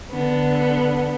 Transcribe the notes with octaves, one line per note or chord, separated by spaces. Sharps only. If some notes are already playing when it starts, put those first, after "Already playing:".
D3 B3